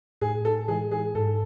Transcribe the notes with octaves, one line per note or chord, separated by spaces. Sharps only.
A2 G#4
A4
E3 G#3 G#4
G#4
G#2 A4